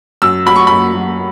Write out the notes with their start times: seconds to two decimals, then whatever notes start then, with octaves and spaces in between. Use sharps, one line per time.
0.22 F#2 E6
0.46 F#3 B5
0.56 C#6
0.67 F#2 B5
0.94 F#3